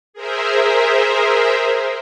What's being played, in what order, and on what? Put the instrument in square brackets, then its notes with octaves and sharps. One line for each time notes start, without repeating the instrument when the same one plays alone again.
[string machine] G#4 A#4 C5 E5